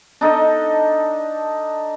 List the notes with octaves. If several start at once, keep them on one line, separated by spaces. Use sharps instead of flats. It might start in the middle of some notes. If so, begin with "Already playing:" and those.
D4 D#4 A4 D#5